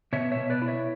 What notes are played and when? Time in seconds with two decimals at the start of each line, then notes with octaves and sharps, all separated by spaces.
0.13 B2 C#5 E5
0.32 C#5 E5
0.37 B2
0.50 B4 D5
0.62 E4
0.68 C#5 E5